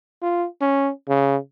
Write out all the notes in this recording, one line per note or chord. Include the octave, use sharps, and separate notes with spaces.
F4
C#4
C#3